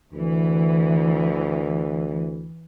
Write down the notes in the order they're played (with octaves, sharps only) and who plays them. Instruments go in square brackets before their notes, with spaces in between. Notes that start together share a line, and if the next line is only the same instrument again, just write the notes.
[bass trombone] D2 [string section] E3